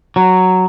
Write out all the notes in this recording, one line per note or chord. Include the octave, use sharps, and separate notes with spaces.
F#3